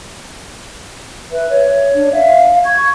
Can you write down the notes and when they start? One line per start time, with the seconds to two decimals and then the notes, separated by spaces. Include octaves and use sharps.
1.32 B4 E5
1.50 C#5
1.94 D4
2.12 E5 F5
2.65 C#6 G#6